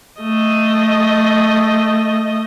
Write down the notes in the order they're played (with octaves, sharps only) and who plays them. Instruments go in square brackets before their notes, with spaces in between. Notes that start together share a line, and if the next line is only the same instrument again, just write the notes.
[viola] A3 D#5